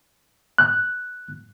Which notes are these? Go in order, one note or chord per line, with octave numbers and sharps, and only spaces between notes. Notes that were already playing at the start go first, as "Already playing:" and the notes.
F#6